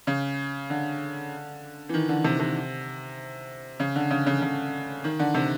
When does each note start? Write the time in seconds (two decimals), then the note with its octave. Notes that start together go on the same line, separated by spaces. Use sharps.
0.07 C#3
0.70 D3
1.89 E3
1.94 D#3
2.09 D3
2.24 C3
2.40 C3
3.80 C#3
3.95 D3
4.11 C#3
4.26 C#3
4.42 C#3
5.04 D#3
5.19 D3
5.35 C3